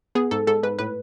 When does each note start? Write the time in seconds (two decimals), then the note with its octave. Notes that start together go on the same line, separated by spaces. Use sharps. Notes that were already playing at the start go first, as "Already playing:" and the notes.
0.15 B3 G#4
0.31 G#2 A4
0.47 G#2 A4
0.63 G#2 B4
0.79 A2 B4